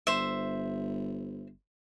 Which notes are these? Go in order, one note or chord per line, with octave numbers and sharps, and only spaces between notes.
G1 C5 E5